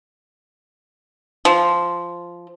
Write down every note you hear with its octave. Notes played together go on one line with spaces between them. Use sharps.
F3